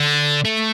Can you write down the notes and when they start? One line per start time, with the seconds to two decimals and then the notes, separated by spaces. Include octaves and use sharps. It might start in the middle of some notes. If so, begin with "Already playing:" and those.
Already playing: D3
0.45 A3